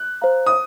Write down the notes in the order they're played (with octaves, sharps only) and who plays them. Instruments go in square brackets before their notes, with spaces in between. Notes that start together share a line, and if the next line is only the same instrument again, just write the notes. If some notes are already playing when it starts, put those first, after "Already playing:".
Already playing: [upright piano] F#6
[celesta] C5 F5 A#5
[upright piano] D#6